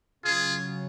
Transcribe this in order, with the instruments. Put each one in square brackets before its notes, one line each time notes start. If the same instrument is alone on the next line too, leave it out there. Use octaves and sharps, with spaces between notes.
[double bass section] C#3 F#3 C#4 [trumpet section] F4 G#4